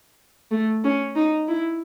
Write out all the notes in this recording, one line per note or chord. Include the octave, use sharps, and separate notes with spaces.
A3
C#4
D#4
E4